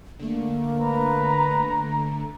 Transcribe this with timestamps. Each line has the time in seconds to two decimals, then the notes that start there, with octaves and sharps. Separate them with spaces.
0.19 D3 A3 A#3
0.79 B4 A#5